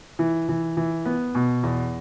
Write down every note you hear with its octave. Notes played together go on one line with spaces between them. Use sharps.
E3
E3
E3
B3
B2
E2